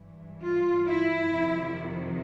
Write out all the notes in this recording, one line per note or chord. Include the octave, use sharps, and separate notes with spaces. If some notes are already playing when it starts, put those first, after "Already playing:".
Already playing: G2 E3
F4
E4
F2 C3 D#3